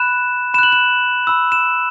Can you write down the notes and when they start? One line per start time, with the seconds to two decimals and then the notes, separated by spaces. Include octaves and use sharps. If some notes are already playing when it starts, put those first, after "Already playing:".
Already playing: B5 F#6 E7
0.54 B5 E7
0.58 F#6 F#7
0.72 E7
1.27 B5 E6
1.52 E7